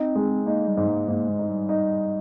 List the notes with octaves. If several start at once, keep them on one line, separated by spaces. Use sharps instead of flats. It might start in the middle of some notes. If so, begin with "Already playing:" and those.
Already playing: C4 D#4
G#3
A#3 D#4
G3
G#2
A#3
G#2 A#3
G#3
D#4
G3
D#4